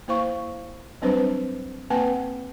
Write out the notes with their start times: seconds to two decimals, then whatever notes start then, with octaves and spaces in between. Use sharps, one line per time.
0.08 A#3 E4 C5 F5 C#6
1.02 F#3 G3 C4 D4 B4 C5
1.90 A#3 C4 B4 F#5 G#5 A5